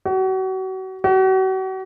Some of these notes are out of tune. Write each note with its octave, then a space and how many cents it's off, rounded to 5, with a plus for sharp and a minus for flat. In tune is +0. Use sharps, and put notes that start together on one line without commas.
F#4 +35
F#4 +40